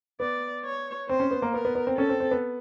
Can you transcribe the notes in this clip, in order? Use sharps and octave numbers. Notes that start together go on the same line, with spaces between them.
B3 D5
C#5
C4 C5
C#4
B3
A#3
B3 A#4
B3
B3
C4
C#4 A4
C4
C4
B3